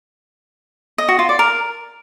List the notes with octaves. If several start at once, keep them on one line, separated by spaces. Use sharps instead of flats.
D#5
F#4
F4
D5
A#4